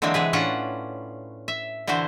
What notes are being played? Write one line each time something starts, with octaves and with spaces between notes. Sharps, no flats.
D3 E3 F#3 G#3 A#3 C4
C3 E3 G#4 B4
A2 C#4 D4 F4 F#5
E5
D3 E3 E4 F#4 C5